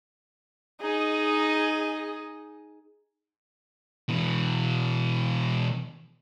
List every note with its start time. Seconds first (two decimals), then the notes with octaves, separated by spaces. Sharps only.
0.81 D#4 G#4 D#5
4.09 B2 E3